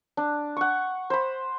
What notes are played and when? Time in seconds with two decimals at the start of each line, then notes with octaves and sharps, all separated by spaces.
0.17 D4
0.57 F#5 C#6
1.10 C5 B5